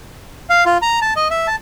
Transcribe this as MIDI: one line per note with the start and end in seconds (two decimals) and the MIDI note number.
0.50 0.64 77
0.66 0.78 65
0.82 1.00 82
1.02 1.14 81
1.16 1.28 75
1.31 1.47 76
1.47 1.56 81